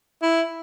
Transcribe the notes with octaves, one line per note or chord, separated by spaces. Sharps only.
E4